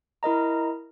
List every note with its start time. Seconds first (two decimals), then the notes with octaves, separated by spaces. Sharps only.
0.23 E4 A#4 D#5 A#5